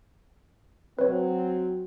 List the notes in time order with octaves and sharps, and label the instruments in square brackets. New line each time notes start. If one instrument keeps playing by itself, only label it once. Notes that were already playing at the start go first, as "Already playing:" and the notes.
[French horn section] F#3 C4 [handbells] B4 C#5